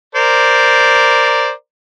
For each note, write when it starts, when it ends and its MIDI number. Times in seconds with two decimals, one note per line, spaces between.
0.15 1.51 70
0.15 1.51 72
0.15 1.51 74